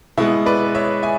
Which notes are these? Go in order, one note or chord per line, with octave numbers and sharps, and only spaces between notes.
B2 G#3 B3 E4
B4 D5
C#5 E5
E5 G#5